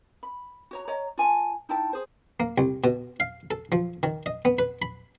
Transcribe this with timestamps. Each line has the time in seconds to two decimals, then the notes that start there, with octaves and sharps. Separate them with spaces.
0.23 B5
0.71 F#4 C#5 A#5
0.88 C#5 D#5 A#5
1.17 F4 G#5 A5
1.69 D#4 E4 G5 A5
1.93 G#4 C5
2.40 A#3
2.58 C2
2.84 B2
3.20 F5
3.51 A4
3.72 F3
4.03 D#3
4.26 D#5
4.45 B3
4.59 B4
4.82 B5